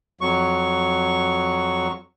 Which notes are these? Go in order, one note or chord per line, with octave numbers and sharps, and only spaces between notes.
F2 F#3 C#6